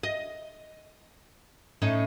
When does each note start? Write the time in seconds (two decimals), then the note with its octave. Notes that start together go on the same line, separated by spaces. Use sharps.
0.03 D#5
1.82 A2 C#4 D#4